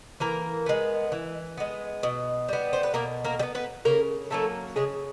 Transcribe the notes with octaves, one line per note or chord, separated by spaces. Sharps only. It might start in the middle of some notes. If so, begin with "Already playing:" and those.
E3 A#3 A#4
G#3 B3
E3
G#3 B3
B2
G3 B3
C5
B4
B2 A#3 A#4
A#3 A#4
G3
B3
B3 B4
C#3 A#3 A#4
F#3 A3 A#3 C#4 A4
C#3 G#3 G#4